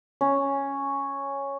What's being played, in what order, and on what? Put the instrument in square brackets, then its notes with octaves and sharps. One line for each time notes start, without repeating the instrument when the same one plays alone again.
[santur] C#4